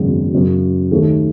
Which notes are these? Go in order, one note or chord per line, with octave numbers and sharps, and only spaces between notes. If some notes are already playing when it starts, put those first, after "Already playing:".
Already playing: G#1 F#2 C#3 G#3 B3
F#2 C#3 F#3
D#2 D#3 A3 D#4 A4